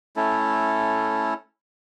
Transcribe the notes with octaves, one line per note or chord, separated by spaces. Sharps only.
A3 C#4 E4 A4